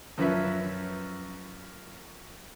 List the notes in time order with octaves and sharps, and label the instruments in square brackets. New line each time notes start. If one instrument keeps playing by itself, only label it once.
[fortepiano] F#2 F3 C#4 B4 E5